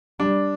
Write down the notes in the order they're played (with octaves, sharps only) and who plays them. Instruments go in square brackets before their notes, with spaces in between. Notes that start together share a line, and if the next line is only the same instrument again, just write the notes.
[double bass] G3 [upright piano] D4